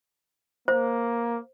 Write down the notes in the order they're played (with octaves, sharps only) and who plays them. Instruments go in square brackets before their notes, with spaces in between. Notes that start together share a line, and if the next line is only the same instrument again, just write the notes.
[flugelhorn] A#3 [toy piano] C5